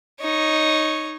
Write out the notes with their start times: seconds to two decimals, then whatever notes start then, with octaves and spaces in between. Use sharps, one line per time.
0.21 D#4 C#5